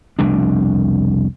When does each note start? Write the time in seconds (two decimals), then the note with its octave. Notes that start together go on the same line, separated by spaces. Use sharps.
0.19 F1 C2 B2 D4